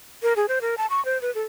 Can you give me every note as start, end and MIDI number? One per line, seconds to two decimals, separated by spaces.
0.23 0.33 70
0.36 0.46 68
0.48 0.59 72
0.62 0.75 70
0.78 0.86 81
0.90 1.04 85
1.05 1.20 72
1.22 1.33 71
1.35 1.42 69